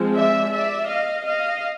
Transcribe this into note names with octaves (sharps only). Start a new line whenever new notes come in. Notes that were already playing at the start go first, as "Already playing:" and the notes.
Already playing: F3 G#3 C4
D5 E5
D5 E5
D#5 F5
D#5 F5